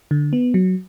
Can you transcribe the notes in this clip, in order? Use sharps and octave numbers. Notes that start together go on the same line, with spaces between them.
D3
B3
F#3